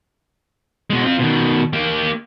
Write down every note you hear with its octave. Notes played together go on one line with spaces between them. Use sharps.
B2 G#3
C4 F4
B2 D#3
A#3 G4